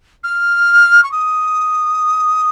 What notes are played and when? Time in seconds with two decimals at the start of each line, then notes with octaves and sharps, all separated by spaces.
0.24 F6
1.04 C#6
1.12 D#6